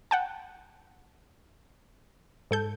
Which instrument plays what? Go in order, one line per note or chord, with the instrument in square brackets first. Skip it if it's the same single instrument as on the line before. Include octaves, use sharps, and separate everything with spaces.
[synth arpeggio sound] F#5 G5 A5
G#2 A4 G6